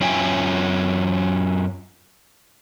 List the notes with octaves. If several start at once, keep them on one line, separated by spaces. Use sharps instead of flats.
F#2 C#4 F4 E5 G5 G#5